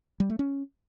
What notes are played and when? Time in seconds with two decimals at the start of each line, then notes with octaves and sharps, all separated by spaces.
0.20 G3
0.30 A3
0.39 C#4